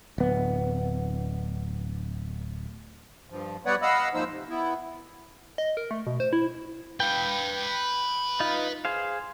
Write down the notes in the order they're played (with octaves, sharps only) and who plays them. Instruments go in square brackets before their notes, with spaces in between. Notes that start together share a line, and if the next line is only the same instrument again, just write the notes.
[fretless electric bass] D1 B3
[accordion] G2 F3
G3 B3 B4 C#5 D5 F#5
D#5 F5 F#5 B5 E6
G#2 F3 A#3 D#4 C5 E6
C3
B3 E4
[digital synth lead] D#5
A#4
A3
B2
C5
E4
[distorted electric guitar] B4 F5 [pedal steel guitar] G5
[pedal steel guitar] D#4 F4
G#4 C5 F5